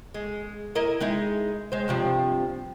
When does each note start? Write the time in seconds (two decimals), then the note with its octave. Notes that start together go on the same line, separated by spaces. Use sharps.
0.14 G#3
0.75 E4 A#4 D#5
1.01 G#3 D#4 E4
1.72 G#3 C5
1.88 G2 C3 F3